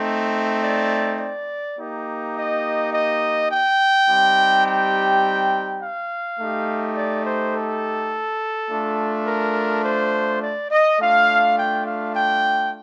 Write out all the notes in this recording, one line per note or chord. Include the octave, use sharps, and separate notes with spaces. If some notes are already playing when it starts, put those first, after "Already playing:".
Already playing: A3 C4 D#4
D5
D5
A#3 D#4 G4
D#5
D#5
G5
G3 C4 D#4 G4
G5
F5
A3 D#4 G4
D5
C5
A4
A3 D4 F4
A#4
C5
D5
D#5
A3 D4 F4 F5
G5
F5
G5